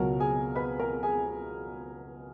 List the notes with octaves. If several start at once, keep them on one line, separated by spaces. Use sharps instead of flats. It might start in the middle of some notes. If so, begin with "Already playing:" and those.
Already playing: C#2 B2 F#3 A#4 A#5
G#4 G#5
B4 B5
A#4 A#5
G#4 G#5